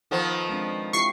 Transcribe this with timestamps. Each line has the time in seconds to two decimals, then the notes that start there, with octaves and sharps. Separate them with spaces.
0.11 D#3 F3 B3 F4 A4 C5
0.49 G#3 C4 D4
0.93 E4 F4 G4 C#6 C7